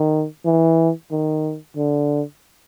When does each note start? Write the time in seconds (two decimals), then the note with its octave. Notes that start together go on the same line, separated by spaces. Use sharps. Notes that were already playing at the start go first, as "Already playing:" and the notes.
Already playing: D#3
0.45 E3
1.11 D#3
1.77 D3